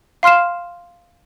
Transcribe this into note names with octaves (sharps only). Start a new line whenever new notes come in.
F5 C6 F6 C7 E7